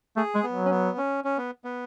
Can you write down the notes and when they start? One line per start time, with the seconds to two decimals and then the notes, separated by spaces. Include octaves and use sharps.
0.16 A3 G#4
0.35 G#3
0.43 B3
0.52 F#3
0.65 C#4
0.71 B3
0.98 C#4
1.24 C#4
1.38 B3
1.64 B3